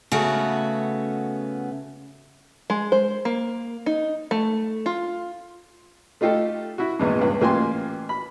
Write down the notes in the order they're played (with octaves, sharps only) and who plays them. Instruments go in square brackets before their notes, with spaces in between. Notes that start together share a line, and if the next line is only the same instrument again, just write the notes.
[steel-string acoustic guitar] C#3 A3 B3 F#4
[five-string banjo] G#3
C5
A#3
D#4
A3
F4
[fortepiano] A3 D#4 F4 G4 A4
E4 F#4
A#1 E2 G#2
C#2 G2
A1 A#3 F4 G4 G#5 C6
B5